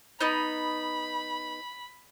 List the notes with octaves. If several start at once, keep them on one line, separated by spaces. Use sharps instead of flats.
B3 D#4 B5